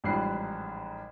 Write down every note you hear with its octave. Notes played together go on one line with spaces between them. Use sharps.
A1 G#2 F3 G3 F#6 C7